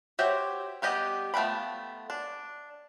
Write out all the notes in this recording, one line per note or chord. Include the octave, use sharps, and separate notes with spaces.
F#4 G4 C5 C#5 E5
G3 B3 G4 D#5
F3 A3 B3 G5 B5
D4